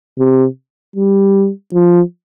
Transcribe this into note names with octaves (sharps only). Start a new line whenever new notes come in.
C3
G3
F3